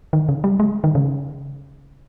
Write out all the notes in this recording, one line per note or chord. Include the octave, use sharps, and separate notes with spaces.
D#3
C#3
G3
G#3
D#3
C#3